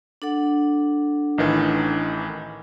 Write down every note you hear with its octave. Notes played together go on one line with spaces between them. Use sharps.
D4 A4 F#5
A1 D#3 E3